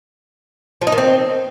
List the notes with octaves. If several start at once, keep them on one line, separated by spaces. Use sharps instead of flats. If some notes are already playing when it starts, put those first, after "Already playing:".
F3
D#4
D#3
C4